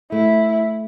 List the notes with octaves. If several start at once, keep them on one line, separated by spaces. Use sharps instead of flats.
A3 E4